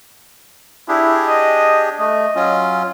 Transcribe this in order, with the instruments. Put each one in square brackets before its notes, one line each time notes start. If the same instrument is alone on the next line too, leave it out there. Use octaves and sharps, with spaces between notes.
[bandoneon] D4 G4 G#4 [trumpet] E4
[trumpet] D#5
[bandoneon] A3 [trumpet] D#5
[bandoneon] F#3 C#4 F4